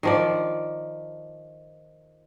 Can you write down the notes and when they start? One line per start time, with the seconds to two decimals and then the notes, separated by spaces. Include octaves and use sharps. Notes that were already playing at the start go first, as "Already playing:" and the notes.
0.03 D#3 F3 D5